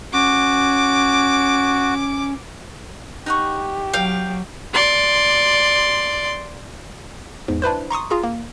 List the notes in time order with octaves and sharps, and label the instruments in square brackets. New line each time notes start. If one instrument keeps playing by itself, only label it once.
[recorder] C#4 [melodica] F#4 [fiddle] D6
[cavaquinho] D#4 F#5 C#6 [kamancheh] G4
[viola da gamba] F#3 [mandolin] F5 G5
[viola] D5 C6
[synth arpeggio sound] E2 G#2
D4 E4 B4 C5
A#5 C6 C#6 D#6
F4 G#4 A#5
A#3